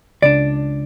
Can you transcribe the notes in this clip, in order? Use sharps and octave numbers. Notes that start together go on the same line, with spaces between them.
C#2 C#3 D4 D5